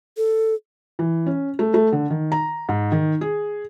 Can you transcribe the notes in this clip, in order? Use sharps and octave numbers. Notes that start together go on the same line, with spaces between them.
A4
E3
C#4
A3
A3
D3
D#3
A#5
G#2
D#3
G#4